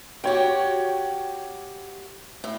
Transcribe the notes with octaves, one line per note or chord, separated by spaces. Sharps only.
F#4 G4 C#5 G5
A2